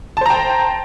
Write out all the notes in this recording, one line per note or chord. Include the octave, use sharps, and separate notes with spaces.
C5 G5 A5 A#5